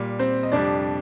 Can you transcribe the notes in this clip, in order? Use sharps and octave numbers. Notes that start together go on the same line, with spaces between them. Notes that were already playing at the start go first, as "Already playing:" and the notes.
Already playing: A#2 G3
C4 C5
D#5
F2 C3 G3 D4 D5